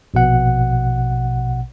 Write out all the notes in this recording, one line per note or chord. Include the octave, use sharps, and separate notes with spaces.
A#1 B2 F#5